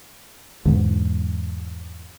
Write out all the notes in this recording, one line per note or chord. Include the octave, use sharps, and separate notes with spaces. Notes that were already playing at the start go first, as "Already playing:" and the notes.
E2 G#2 D3